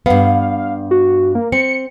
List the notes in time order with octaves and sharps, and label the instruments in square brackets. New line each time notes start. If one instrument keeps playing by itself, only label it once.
[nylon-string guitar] G2 B3 [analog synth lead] F5
[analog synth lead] F#4
A#3
[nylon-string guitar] C4 [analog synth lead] C#7